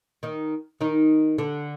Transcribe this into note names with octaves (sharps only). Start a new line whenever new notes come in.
D#3 D#4
D#3 D#4
D3 D4